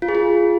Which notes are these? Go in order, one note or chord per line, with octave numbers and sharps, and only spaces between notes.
F4
G#4
F4